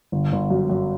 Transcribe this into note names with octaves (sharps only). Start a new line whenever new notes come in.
G1
G1
F#2
F#2